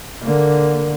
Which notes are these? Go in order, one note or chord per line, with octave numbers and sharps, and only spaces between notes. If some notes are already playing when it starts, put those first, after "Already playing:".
D3 A#3